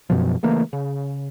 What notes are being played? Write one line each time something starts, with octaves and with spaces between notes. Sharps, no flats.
F#2 B2 F3
C#3 E3 A3 A#3
C#3